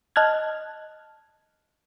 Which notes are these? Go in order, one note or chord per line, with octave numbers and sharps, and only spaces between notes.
D#5 A5 F6 F#6 G#6